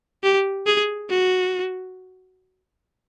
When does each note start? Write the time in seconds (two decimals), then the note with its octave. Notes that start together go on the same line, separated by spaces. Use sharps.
0.23 G4
0.66 G#4
1.09 F#4